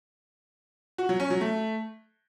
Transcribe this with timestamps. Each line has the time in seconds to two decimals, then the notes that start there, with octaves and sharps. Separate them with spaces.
0.98 F#4
1.09 F#3
1.20 C#4
1.30 F#3
1.41 A3